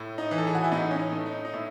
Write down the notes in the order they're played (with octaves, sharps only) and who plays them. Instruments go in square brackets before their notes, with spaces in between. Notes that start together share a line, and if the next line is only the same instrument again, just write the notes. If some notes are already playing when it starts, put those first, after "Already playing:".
Already playing: [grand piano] A2
D#4
E3
A4
G#4
F#4
E4
A2 D#4
C#4
D#4
A3
D#4
D#4
A2 E4